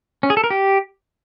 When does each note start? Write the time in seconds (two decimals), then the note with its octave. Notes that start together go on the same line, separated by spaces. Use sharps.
0.23 C#4
0.30 G#4
0.37 A4
0.44 A#4
0.50 G4